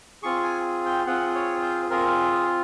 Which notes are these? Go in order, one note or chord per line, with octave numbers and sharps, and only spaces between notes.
C4 F4 G#4 C#6
G#5
G5
C4 F4 G#4 F#5
C#5
C5
C4 F4 G#4 A#4
G#4